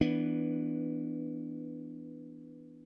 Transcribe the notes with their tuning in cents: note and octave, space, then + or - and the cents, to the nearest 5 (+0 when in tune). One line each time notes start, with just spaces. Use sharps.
E3 -10 B3 +0 D4 +0